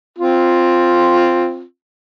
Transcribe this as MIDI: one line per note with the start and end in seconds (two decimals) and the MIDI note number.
0.19 1.63 60
0.19 1.63 65